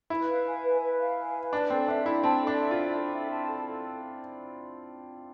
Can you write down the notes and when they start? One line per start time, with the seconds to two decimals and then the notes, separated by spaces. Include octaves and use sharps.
0.10 E4 B4
0.28 F5
0.46 G#5
0.64 B4
0.81 B4
0.99 F5
1.17 G#5
1.35 B4
1.53 D4 A5
1.70 C4 A4
1.88 D4 E5
2.06 D4 E4
2.23 C4 A5
2.41 A4
2.47 D4
2.59 E5
2.71 F4
2.77 D4
2.94 A4
3.13 E5
3.30 A5
3.48 A4
3.66 A4